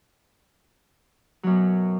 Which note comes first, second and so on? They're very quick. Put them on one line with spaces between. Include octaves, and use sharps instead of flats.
F#3 F#2 B2